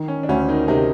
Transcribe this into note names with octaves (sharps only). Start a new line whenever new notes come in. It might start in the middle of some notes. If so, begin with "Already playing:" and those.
Already playing: D#3
C#4
D4
D2 C#4
D#3 D#4
C3 D#3 D#4